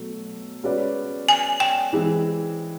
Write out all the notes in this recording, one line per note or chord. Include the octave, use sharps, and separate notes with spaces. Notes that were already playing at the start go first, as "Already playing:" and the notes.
Already playing: B2 F#3 A3
G#3 C#4 F#4 B4 D5
G#5
G5
E3 G#3 C4